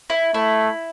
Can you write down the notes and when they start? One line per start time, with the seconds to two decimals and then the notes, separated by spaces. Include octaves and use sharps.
0.10 E4
0.34 A3 E4